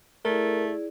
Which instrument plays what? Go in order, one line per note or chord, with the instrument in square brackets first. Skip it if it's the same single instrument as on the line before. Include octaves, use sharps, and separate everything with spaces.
[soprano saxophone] A3 [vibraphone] E4 G#4 D5 [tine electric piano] A#4